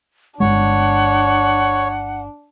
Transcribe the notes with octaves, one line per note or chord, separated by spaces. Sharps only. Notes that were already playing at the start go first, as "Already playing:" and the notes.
G1 E2 G#3 D4 C#5 F#5